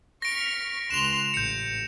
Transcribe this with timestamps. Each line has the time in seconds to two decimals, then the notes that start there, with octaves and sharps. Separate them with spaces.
0.22 C#6 F6 A#6 B6 D7
0.91 C#2 C6 F#6 E7 F7
1.34 A1 G6 C#7